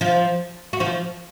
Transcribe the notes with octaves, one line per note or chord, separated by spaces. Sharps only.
F3 F4
F#4
F3 F4